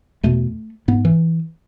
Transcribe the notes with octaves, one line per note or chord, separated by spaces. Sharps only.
E2 B2 A3
G#2 B3
E3